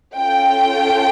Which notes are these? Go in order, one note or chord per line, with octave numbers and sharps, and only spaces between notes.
C#4 F4 A4 G5